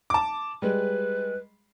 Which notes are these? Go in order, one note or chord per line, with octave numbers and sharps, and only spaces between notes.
A5 D6
G3 G#3 B4